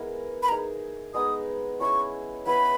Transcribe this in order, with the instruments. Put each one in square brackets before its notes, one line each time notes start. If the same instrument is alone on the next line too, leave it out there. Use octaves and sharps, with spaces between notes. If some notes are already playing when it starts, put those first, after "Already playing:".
Already playing: [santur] G#3 B3 E4 A#4
[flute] B5
[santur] A#3 D#4 G#4 [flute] A#5
[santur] G#3 B3 D#4 [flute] D#6
[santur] C#4 E4 G#4 C#5 [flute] C#6
[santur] B3 E4 B4 [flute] B5